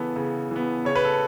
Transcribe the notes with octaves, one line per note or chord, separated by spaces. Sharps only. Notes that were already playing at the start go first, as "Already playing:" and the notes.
Already playing: C#3 E3 B3 A4
C#3
E3 B3
C#3 C#5
B4
A4